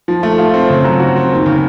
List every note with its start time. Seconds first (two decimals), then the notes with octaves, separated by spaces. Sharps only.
0.08 F3
0.23 A3
0.38 F4
0.54 C4
0.70 C#3
0.84 F#3
1.00 F#4
1.16 C4
1.32 D#2
1.46 C#3